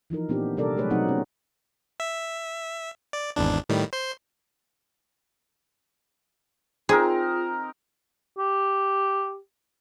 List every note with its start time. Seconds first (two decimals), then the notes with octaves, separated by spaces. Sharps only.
0.10 E3 F3 D#4 A#4
0.29 A#2 B3 C4 D4 D#4 G4
0.57 C3 G3 D4 A4 A#4 D5
0.77 F#3 G#3 A3 G#4 B4 C#5
0.90 B2 F#3 B3 C4 D#4 F#5
1.09 C#4
2.00 E5
3.13 D5
3.36 G#1 E2 D4
3.69 A2 D#3 G3
3.93 C5 C6
6.89 C4 D#4 F4 G#4 A#4
8.38 G4